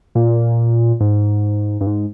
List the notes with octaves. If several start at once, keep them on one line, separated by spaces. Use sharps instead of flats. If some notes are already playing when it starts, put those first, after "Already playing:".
A#2
G#2
G2
G#2